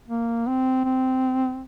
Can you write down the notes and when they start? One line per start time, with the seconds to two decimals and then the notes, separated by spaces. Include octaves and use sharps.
0.08 A#3
0.47 C4
0.85 C4